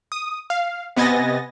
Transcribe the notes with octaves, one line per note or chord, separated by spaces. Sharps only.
D#6
F5
C3 B3 D#5 G#5 A6 A#6